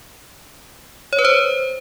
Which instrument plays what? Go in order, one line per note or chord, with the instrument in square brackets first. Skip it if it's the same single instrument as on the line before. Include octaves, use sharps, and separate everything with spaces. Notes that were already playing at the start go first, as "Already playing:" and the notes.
[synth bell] C#5
B4
C5